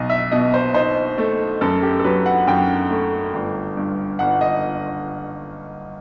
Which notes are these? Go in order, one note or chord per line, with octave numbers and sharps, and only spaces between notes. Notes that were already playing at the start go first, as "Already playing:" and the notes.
Already playing: B1 D#5
E5
B2 D#5
C5
D#4 C5
A3
F#2 A4
G4
A4
F#3 B4
F#5
F#2 G5
A3
G1
G2
G1 F#5
D#5